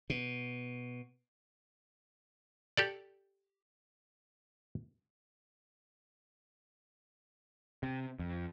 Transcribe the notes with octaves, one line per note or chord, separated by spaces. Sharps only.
B2
G4 A4 D5
C3
F2